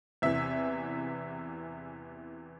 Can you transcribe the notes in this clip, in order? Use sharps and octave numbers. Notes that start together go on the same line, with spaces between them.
E2 C3 E3 E5